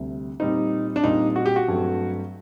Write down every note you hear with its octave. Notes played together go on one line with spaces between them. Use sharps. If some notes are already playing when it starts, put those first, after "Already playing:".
Already playing: D2 C3 G3
A#2 G3 C4 D#4
D4
A#2 G3 C4 D#4
F#4
G4
F#4
G2 F#3 A3 C4